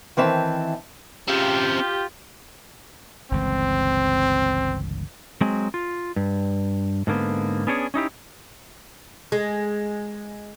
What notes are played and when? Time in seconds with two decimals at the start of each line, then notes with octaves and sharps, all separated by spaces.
0.17 D#3 E3 C4 E5 A5
1.28 C#3 C4 F4 G4
3.31 G1 C#2 E3 C4
5.41 F#3 G#3 C4
5.74 F4
6.16 G2
7.07 G#2 D3 A#3 B3
7.67 B3 C#4 D4 G#4 C#5
7.94 C#4 D#4 E4 G4
9.32 G#3